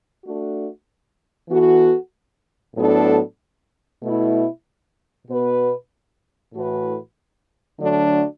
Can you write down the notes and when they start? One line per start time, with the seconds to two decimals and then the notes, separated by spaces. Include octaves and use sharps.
0.23 A3 D4 F#4
1.49 E3 B3 F#4 A4
2.75 A2 F#3 B3 D4 A4
4.02 B2 A3 E4
5.27 B2 B3 F#4 B4
6.54 A2 E3 A3 F#4 B4
7.79 D3 F#3 A3 D4 F#4